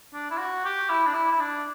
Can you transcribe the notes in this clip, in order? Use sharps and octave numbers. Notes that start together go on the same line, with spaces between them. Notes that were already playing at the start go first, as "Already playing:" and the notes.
D4
E4
F#4
G4
E4
D4
E4
E4
D4